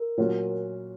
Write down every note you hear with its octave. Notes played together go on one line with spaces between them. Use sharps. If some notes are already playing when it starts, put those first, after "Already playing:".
Already playing: A#4
A#2 F#3 C#4 F#4